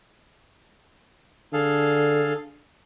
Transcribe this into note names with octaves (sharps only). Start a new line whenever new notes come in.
D3 G#4 A4 F5